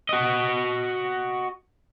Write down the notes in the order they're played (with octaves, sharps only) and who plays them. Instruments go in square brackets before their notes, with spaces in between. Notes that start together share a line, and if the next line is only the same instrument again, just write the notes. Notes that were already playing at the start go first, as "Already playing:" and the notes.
[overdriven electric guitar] F#4 D#5